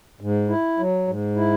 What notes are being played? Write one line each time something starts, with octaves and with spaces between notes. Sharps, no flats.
G#2
E4
F#3
G#2
E4